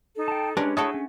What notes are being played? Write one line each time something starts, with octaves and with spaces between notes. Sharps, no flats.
D#4 A4
G5 A5
G#3 C#4 D4 G4 A#4 B4 D5
A3 E4 F#4 G#4 A4 C#5 D#6
C#4